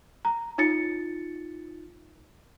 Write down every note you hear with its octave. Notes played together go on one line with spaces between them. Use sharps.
A#5
D#4 F4 A6 C#7